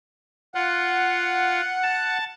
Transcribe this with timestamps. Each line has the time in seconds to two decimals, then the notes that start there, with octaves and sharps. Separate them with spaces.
0.55 F4 F#5
1.83 A5